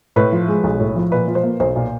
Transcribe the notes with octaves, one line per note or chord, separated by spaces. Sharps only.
A2 B4
F3
G#3
B1
A2
F3
A#2 B4
F3
C5
A#3
B1 C5
A#2